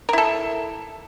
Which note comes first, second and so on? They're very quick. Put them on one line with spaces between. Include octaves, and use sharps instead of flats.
A#4 E4 A4